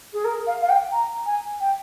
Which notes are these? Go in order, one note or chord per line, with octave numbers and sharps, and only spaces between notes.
G#4
A#4
F5
F5
G5
A#5
G#5
G5